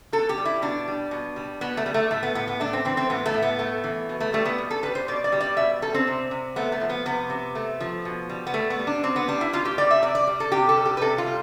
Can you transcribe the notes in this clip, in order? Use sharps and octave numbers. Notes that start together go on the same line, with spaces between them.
B2 A4
G4
G3
E4
B2 D4
G3
B2
G3
B2 B3
A3
G3
A3
A2 A3
B3
A2 B3
B3
A3 D4
C4
E3 C4
C4
A2 B3
A3
A2
B3
A3
E3
B2
A3
G3 A3
B3
B2
A4
G3 B4
C5
B2 D5
D5
G3
D5
B2 E5
G3 A4
C4
C3
C3
A3 B3
A3
F3
B3
C3 B3
C3
A3
F3
B2
G3
B3
B2 A3
B3
G3
D4
B2 C4
B3
G3 D4
E4
B2 F4
G4
G3 D5
E5
C3 D5
D5
G3
A4
C3 G4
A4
G3
G4
B4
C3 A4
F4
G3